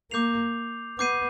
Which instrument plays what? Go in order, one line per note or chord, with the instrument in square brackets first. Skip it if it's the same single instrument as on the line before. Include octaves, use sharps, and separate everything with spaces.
[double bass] A#3 [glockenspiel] D6 G6 C7 F7
[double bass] B3 [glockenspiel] D6 G6 C7 D#7